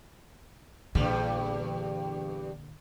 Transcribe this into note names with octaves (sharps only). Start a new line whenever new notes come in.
A#1 E2 G2 D3 G3